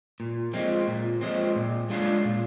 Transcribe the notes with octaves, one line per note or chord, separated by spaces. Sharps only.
A#2
F3 G#3 C4
A#2
F3 G#3 C4
A#2
G#3 D4 F4 G#4
A#2